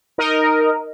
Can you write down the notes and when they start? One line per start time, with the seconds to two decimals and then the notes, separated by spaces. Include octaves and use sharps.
0.18 D#4 A#4 D#5